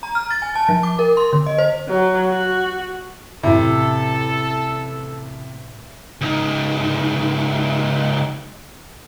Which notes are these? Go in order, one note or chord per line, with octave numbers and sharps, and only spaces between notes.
A#5
F6
A6
G#5
A5
F3
D6
A#4
C6
D3
D#5
C5
F#3
F#4
A1 C3 E4 A4
C#2 D#4